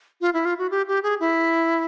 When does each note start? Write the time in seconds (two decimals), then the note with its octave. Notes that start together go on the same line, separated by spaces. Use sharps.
0.21 F4
0.34 E4
0.45 F4
0.58 F#4
0.71 G4
0.88 G4
1.03 G#4
1.20 E4